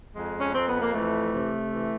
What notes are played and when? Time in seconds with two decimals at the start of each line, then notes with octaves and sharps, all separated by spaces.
0.15 F2 G#3
0.40 C#4
0.54 F2 C4
0.68 B3
0.81 A#3
0.94 E3 A3
1.34 C3
1.73 E3